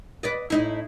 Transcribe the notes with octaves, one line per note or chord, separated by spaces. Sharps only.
B4 D5 D#5
A2 D#4 E4